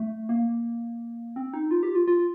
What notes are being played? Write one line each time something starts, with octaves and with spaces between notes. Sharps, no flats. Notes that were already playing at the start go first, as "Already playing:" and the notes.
Already playing: A3
A#3
C4
D#4
F4
G4
F4
F4